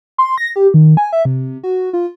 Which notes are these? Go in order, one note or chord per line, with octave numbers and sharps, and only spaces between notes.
C6
A#6
G4
D#3
G#5
E5
C3
F#4
F4